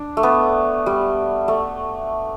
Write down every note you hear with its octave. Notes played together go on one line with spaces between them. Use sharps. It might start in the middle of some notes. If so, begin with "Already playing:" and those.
Already playing: D4
A3
B3
G3
A3